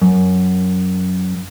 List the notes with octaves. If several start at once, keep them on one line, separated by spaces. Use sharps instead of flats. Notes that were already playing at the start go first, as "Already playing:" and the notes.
F#2